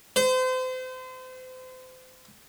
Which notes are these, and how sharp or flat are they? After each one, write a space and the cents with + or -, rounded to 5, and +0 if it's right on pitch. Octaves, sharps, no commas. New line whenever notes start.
C5 -35